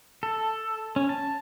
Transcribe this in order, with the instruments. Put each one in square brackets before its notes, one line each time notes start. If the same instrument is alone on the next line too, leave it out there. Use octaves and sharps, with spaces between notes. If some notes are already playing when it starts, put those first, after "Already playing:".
[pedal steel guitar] A4
C#4
A5